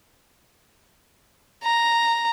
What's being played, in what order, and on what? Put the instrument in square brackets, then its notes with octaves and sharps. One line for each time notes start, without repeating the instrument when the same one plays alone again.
[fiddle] A#5